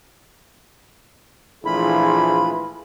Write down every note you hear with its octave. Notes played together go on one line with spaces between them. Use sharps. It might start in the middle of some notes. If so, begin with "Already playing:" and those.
A#1 E3 A3 E4 F4 G#4 B5